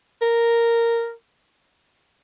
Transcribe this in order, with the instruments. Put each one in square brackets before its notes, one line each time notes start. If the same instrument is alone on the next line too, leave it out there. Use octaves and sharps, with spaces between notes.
[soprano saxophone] A#4